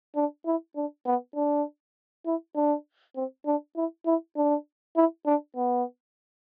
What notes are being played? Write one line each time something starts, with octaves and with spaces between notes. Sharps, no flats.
D4
E4
D4
B3
D4
E4
D4
C4
D4
E4
E4
D4
E4
D4
B3